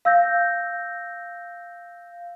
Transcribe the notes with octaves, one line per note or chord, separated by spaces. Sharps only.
F5 E6 G6 A#6